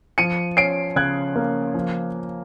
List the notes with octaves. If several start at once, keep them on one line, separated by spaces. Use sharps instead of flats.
F3 C#7 D#7
C#4 C7 D7
C#3 F#6 G#6
A#3
F3